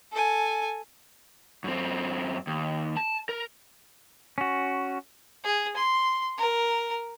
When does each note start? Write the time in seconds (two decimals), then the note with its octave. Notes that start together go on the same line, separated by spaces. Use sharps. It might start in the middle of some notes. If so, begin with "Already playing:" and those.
0.13 A4 G#5
1.64 F#2 C4
2.47 D#2
2.97 A5
3.29 A#4
4.38 C#4 F#4
5.44 G#4
5.77 C6
6.38 A#4